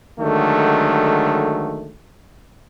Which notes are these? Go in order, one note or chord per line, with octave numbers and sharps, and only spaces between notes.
D3 D#3 F#3 G#3 A3